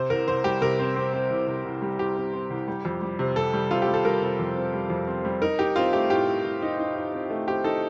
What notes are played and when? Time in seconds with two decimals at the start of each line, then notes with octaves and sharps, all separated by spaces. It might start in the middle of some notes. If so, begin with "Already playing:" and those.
Already playing: C3 C5
0.10 C2 A#4
0.28 C2 C5
0.44 G3 G4
0.61 C3 A#4
0.79 C4
0.96 C4
1.13 C4
1.30 C2
1.47 C3
1.65 C2
1.82 G3
1.98 C2 G4
2.17 C4
2.33 C4
2.50 C2
2.68 G3
2.85 F2
3.02 G3
3.19 C3
3.36 C3 A4
3.53 G3
3.71 C3 F4
3.82 G4
3.88 G3
3.94 A4
4.05 G3 A#4
4.22 C3
4.39 F2
4.56 C4
4.73 G3
4.90 F2
5.07 C4
5.25 G3
5.42 D#4 A#4
5.59 D#4 G4
5.76 C4 F4
5.93 A3 G4
6.10 A2 G4
6.28 A2
6.45 A2
6.62 D#4
6.79 D#4
6.96 D#4
7.13 C4
7.30 A3
7.48 C4 G4
7.64 D#4 A4